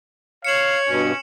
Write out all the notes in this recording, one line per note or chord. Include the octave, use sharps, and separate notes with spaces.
C#5 F5 C#7 E7 F#7
G2 B2 C#4